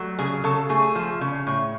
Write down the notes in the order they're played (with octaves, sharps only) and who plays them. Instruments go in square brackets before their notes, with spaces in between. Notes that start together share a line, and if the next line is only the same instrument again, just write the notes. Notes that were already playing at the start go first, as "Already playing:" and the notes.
Already playing: [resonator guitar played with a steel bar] F#3 A3
C#3 G#4
C#3 A4
A3 G#4
F3
C#3
A2